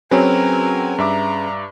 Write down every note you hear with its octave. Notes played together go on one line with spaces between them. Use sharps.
F#3 C4 C#4 F#4 G#4 A#4 B4 G#5
G2 E5 A#5 D6